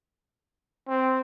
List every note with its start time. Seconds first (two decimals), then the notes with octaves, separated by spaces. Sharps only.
0.88 C4